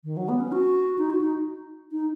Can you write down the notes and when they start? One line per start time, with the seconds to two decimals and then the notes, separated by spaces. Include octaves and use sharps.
0.04 D#3
0.17 F#3
0.29 B3
0.40 C#4
0.52 F#4
0.98 D#4
1.10 F#4
1.21 D#4
1.92 D#4